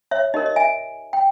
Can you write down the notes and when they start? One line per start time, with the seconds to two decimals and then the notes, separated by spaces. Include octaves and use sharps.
0.11 C#5 E5
0.34 D#4 G4 A#4 C#5 D#5
0.46 D#5
0.56 E5 G#5
1.13 G5